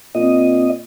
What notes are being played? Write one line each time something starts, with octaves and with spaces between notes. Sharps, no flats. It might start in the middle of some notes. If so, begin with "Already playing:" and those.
A#2 C4 D#5